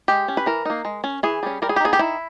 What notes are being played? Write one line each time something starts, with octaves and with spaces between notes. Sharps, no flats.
G#3 G4
C#4
B4
E3 A#4
A#3 D#4
G#3
C#4
E3 G#4
G3 C#4
G3 A#4
G#4
G4
B3 D#4 G#4
G4
D#3 E4